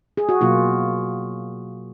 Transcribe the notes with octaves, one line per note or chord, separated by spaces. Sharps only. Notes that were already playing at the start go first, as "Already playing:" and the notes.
G#4
F#4
B2 F#3 A#3 F4